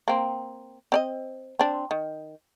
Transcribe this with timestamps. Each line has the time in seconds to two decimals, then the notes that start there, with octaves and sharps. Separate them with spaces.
0.08 A#3 C4
0.92 C4 D5 D#5
1.59 C4 D4
1.91 D#3